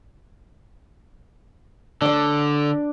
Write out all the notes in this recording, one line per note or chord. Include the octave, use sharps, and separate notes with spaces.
D3 D4 D5